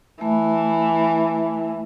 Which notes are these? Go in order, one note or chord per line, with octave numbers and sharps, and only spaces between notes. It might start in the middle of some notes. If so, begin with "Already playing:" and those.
E3 A3